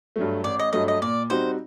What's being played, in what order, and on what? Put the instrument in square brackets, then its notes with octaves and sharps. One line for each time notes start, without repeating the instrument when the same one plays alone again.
[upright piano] G2 F#3 A3
[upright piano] A1 [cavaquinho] D5
[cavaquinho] D#5
[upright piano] G2 F#3 A3 [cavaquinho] D#5
[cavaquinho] D#5
[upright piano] A#2 [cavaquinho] D5
[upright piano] G3 C4 D#4 F#4 [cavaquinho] C5